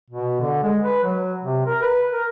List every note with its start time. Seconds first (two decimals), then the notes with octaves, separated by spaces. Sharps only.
0.10 B2
0.40 D3
0.63 G#3
0.83 B4
1.03 F#3
1.42 C3
1.66 A#4
1.82 B4
2.12 A#4